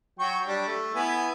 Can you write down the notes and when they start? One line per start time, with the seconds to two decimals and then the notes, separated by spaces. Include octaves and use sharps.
0.19 F#3 G5 C#6
0.47 G3 D4
0.68 A3
0.95 B3 E4 G#5